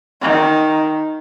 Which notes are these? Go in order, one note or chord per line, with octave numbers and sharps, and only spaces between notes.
D#3